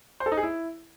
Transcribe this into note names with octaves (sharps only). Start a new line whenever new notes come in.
C5
A4
D#4
G#4
E4